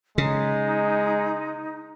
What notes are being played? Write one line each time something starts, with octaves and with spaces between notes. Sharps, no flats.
C#3 G#3 D#4